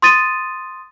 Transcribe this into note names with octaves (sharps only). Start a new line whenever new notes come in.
C6 D#6 A6 D#7